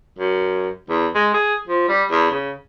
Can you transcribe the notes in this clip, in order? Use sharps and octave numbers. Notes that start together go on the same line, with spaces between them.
F#2
E2
G#3
G#4
F3
G3
E2
C#3